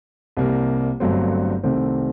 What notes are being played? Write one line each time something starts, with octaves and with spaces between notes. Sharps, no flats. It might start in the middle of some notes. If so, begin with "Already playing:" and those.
C2 C3 G3 A#3
G1 G2 F#3 A3 C4
C2 C3 D#3 A3 C4